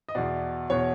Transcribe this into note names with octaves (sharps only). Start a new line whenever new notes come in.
D#5
E2 B2 D5
E2 B2 C#5